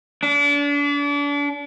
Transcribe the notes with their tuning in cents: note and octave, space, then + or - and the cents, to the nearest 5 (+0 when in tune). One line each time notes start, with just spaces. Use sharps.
D4 -35